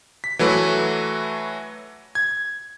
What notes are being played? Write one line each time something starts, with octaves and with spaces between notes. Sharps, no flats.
B6
E3 F#3 A3 B4
G#6